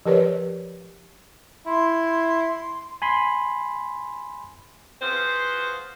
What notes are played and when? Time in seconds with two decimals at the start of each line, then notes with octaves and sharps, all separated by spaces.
0.06 F3 G4 A#4 B4 C#5 D5
1.66 E4 C6
3.02 G#5 B5 C6
5.02 F4 F#4 G#4 B4 C5